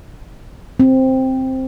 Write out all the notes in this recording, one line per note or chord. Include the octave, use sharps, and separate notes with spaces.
C4